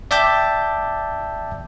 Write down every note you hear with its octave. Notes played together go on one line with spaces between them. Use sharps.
D5 E5 G5 A5 D6 G6